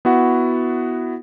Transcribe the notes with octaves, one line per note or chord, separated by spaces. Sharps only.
B3 E4 F#4 F#5